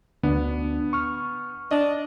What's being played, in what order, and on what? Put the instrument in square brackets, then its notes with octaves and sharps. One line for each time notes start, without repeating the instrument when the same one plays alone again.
[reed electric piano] D2 D4 [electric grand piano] B3
[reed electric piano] C#6 F6
[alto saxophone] D4 [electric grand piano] D#5